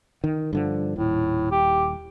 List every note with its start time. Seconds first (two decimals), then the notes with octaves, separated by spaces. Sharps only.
0.24 D#3
0.53 G2 D3 F3
0.96 D#1 A2
1.51 G4